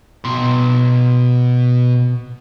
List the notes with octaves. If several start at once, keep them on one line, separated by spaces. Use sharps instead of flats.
B2 C6